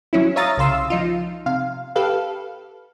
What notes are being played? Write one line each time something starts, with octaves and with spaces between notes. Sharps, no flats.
F#3 C#4 E4
C#5 E5 F5 A#5 D#6 A6
C2 C#3 F5 C6 E6
F3 D#4 F4
C3 F5
G4 A4 B4 F5